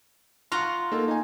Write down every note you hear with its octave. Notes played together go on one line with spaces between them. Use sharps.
F4 F#5 A#5 C6 C#6
A#3 D#4 A4
D#4 G#5